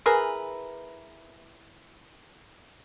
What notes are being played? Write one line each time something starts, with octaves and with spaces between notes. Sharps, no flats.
E3 G#4 A#4 B4